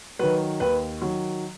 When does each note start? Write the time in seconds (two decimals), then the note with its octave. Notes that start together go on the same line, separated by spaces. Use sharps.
0.19 D#3 F#3 B4
0.60 D#2 B4
1.02 D#3 F#3